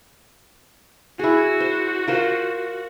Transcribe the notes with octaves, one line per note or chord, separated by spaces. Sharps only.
E4 F#4 G#4
C5
F4 A#4 C5